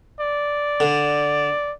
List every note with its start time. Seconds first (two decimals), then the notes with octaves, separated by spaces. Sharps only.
0.21 D5
0.80 D3